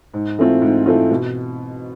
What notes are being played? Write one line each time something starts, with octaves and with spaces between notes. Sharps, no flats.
G#2
E3 A3 C4 F4
G#2
E3 A3 C4 F4
B2